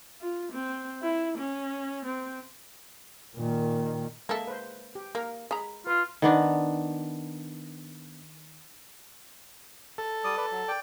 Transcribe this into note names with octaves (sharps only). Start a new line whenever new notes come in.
F4
C4
E4
C#4
C4
A#2 D#3
G#3 A#3 A4 E5
B4 C5
G4
A#3 A#4
G#3 A#5 B5
F4 B4
D#3 B3 D4
A4
G3 D5 D#6
B4 D5
F#3
D5 G5